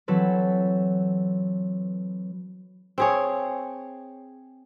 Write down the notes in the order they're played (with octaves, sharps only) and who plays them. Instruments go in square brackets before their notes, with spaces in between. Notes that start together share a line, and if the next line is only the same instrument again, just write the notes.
[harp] E3 F#3 C4 A4 B4
[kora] C4 G#4 C#5